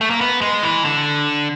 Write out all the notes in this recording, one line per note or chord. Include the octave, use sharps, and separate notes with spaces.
A3
A#3
B3
G#3
E3
D3